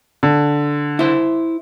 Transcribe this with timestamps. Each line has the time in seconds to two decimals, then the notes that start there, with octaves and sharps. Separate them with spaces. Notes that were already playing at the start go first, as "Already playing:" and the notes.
0.23 D3
0.99 E4 C5